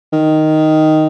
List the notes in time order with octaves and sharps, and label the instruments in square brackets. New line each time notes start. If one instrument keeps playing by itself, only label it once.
[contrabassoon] D#3